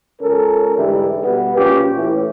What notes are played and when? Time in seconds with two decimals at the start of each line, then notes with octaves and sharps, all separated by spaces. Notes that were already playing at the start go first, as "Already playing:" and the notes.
0.21 C#2 C#4 A4 A#4
0.78 G#2 D3 E3 G3 G#3 E4
1.23 B2 G3 B3
1.57 A#1 A#2 C#4 F4 G4
1.96 A2 E3